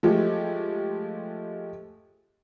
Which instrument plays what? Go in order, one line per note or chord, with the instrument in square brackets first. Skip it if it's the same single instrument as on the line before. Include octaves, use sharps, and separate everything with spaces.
[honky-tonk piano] F3 G#3 A3 G4